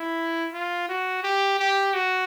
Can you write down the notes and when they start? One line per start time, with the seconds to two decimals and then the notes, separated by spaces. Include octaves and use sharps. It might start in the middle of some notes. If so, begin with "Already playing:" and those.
Already playing: E4
0.53 F4
0.89 F#4
1.23 G4
1.59 G4
1.94 F#4